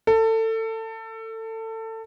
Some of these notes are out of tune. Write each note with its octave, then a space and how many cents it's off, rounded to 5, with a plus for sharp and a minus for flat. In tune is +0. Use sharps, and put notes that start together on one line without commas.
A4 +25